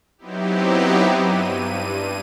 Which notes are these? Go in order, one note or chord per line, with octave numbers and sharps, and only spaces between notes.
F#3 B3 C4 D#4 E4 G4
G2 D#7